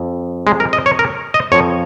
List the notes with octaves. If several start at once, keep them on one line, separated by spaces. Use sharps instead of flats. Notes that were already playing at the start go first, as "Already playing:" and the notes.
Already playing: F2
G#3
A#4
D#5
C#5
A#4
D#5
F2 F3 C#5